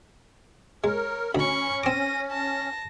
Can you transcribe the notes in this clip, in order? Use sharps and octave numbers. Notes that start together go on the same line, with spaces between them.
G#3 A#4 C#5
D2 C#4 D#5 B5 C#6
C4 D6 A#6 D#7
A5 A#6